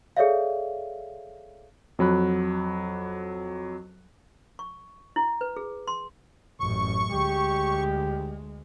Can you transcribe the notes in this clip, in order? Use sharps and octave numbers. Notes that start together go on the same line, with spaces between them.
G#4 A4 C#5 D5 E5 F5
F2 F#3 B5 F#6
C#6
E4
B4
G#4
C6
A1 F#2 C#6
D2 G#3 G4